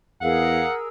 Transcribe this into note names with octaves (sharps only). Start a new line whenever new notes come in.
E2 G#4 A#4 F5 F#5 E6